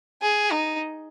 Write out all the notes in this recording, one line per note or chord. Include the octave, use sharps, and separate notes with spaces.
G#4
D#4